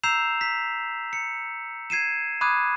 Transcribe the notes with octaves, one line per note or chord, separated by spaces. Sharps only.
A#5 E6 G6 C7 E7 F7
B6
C#7
G#6 C7 D#7 E7
B5 D6 D#6 F#6 G#6 D#7